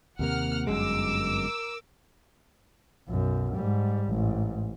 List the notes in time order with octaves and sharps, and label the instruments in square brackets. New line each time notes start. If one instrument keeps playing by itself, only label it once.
[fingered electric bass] D#2 C3 A#3 [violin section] F#5 F6
[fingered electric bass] G1 F#2 G#3 [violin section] A#4 D6 E6
[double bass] B1 F#2
G#2 G3
A1 G#2